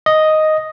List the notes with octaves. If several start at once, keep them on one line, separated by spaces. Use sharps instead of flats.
D#5